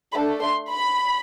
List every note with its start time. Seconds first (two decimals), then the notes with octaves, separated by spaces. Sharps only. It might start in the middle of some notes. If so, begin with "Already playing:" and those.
0.12 A3 D4 A4 B5
0.41 C6
0.70 B5